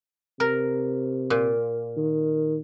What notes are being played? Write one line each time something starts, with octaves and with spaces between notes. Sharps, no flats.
C3 A#4
A#2
D#3